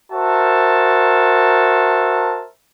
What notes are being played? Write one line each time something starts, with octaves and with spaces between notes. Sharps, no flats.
F#4 A#4 C5 E5 A5